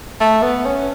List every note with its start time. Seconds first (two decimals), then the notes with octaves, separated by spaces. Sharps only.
0.20 A3
0.42 B3
0.66 C#4